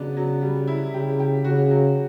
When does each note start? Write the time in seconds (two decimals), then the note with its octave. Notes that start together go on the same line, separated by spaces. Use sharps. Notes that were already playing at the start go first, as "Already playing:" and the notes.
Already playing: C#3 F#3 B3 D4
0.17 F#3
0.42 G3
0.68 E4
0.93 C#3 G4
1.19 G4
1.44 C#3 F#4
1.71 F#3